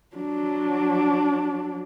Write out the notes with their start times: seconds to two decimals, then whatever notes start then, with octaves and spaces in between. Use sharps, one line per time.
0.16 F#3 D4